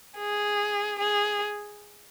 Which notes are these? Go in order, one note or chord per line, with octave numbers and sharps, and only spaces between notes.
G#4
G#4